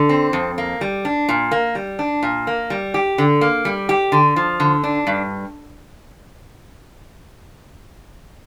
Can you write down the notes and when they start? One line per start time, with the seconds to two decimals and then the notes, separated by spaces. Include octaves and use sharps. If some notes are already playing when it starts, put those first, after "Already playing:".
Already playing: D3
0.09 C4
0.33 F2
0.58 A#3
0.81 G3
1.05 D4
1.29 A#2
1.51 A#3
1.75 G3
1.99 D4
2.23 A#2
2.47 A#3
2.70 G3
2.94 G4
3.18 D3
3.41 A#3
3.65 G3
3.89 G4
4.12 D3
4.36 F3
4.60 D3
4.84 D4
5.07 G2